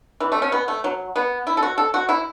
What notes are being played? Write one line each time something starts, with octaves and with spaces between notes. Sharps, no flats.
E3
A3
C#4
B3
A3
F#3
B3
E4
A4
F#4
A4
F#4
E4